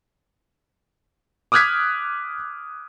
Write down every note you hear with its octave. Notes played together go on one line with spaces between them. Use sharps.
D6 D#6 F6 F#6 G#6 B6